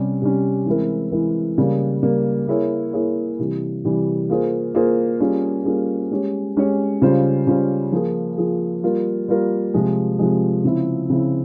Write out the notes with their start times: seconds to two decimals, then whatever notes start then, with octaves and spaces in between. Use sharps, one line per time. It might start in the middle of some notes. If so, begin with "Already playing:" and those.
Already playing: C3 G3 C#4
0.21 C3 G3 C#4
0.66 E3 G#3 C4 E4 A#4
1.12 E3 G#3 C4 E4 A#4
1.58 C#3 G3 A#3
2.03 C#3 G3 A#3
2.47 A#3 E4 G#4 C#5
2.93 A#3 E4 G#4 C#5
3.39 C3 E3 G3
3.84 C3 E3 G3
4.29 A#3 F4 G#4 C5
4.75 A#3 F4 G#4 C5
5.20 G3 A#3 C#4 F4 G#4
5.65 G3 A#3 C#4 F4 G#4
6.11 G#3 C#4 G4 C#5
6.56 G#3 C#4 G4 C#5
7.02 C#3 G3 C#4 F4 C5
7.47 C#3 G3 C#4 F4 C5
7.92 F3 A#3 F4 G#4
8.38 F3 A#3 F4 G#4
8.83 G3 A#3 F4 A#4
9.28 G3 A#3 F4 A#4
9.74 C3 F3 G#3
10.19 C3 F3 G#3
10.64 C#3 F3 C4 E4
11.09 C#3 F3 C4 E4